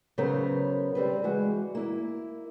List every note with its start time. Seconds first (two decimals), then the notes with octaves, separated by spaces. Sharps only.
0.18 C#3 F#3 B3 A#4 C5 A#5
0.95 G3 C4 B4
1.24 E3 G#3 F#4
1.75 A#3 E4